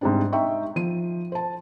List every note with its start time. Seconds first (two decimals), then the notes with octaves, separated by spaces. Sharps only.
0.01 G#2 C3 G3 C4 D4
0.32 D#4 E5 G5 C#6
0.76 F3 D#7
1.32 C5 A5